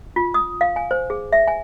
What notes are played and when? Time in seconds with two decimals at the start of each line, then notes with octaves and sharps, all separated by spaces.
0.16 F4
0.34 D#6
0.61 F5
0.76 G#5
0.91 C5
1.10 G#4
1.32 E5
1.47 G#5